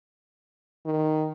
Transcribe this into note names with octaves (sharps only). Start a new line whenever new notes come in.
D#3